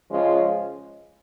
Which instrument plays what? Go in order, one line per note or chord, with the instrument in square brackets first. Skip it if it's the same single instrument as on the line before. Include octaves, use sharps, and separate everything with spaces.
[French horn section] C#3 F3 G#3 C#4 F4